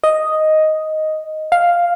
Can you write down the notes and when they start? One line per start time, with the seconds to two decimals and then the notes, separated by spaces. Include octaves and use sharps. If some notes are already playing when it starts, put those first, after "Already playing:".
0.04 D#5
1.52 F5